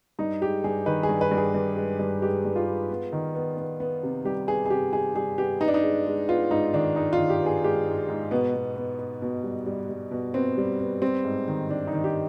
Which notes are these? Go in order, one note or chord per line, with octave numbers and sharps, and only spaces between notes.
G2 D#4
G#3 G4
G2 G#4
D#3 B4
G#4
G2
B4
G2
G#4
G2
G#3
G2
G#3 G4
G2
F4
G#3
B3
D#3
B3
B3
B3
C3
G3 G4
B3 G#4
G#4
C3 G4
G3 G#4
G3 G#4
B3 G4
B3 D#4
D4
D#4
G#3
G#3
B3 F4
G#2 D#4
D#3 D4
G#3 D#4
F4
D#3
G4
B3
G#4
G#3 G4
G#2
G#2
B2 B3
B2
B3
B3
B2
G3
G3
G3
B2
B3 C4
G3
B3
G3 C4
G#2
D#3
D#3 D4
D#4
D#3
G4